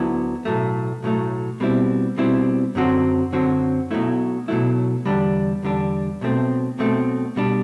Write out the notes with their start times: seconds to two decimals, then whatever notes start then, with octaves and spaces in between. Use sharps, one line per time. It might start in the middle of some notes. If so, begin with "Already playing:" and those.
Already playing: D2 D3 F#3 B3 E4
0.45 B1 A2 F#3 A3
1.03 B1 A2 F#3 A3
1.60 B2 G3 C4 E4
2.18 B2 G3 C4 E4
2.75 F#2 D3 F#3 C4 F#4
3.33 F#2 D3 F#3 C4 F#4
3.91 B1 B2 F#3 A3 E4
4.48 B1 B2 F#3 A3 E4
5.06 E2 D3 G3 D4
5.63 E2 D3 G3 D4
6.21 B1 B2 A3 C4
6.79 B1 B2 A3 C4
7.36 B2 G3 D4